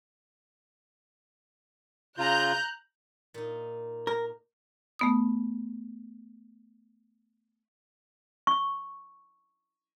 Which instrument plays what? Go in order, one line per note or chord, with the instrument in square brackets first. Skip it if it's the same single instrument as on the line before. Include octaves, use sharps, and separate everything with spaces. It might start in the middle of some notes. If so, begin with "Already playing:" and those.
[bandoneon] C#3 F4 [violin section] A#5 F#6 G6
[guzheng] A#2 D#4
[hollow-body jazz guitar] A#4
[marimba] A3 B3 D#6
[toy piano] C#6